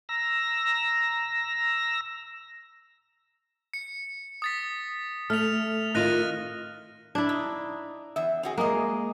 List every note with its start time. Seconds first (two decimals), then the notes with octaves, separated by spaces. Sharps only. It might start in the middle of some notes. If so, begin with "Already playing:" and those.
0.09 A#5 E6 A#6
3.74 C#7
4.42 D#6 A6 B6
5.30 A3 F6 F7
5.95 D#3 F4 F#6 A#6 D#7
7.15 D4 E4
7.29 D#4
8.16 E2 E5
8.43 C4 F#4 G#4
8.58 G#3 A#3 G#4 D#5